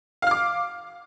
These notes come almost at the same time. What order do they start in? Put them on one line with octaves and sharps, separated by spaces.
F5 F6 D6